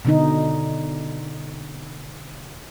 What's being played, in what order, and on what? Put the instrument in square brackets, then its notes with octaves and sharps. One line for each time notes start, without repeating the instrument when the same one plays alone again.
[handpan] B2 D3 D#4